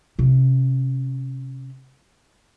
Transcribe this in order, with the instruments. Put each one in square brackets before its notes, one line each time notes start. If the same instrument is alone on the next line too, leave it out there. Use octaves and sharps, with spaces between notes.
[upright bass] C3 C#4